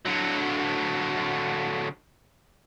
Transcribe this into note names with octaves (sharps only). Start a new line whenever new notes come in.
D3 F#3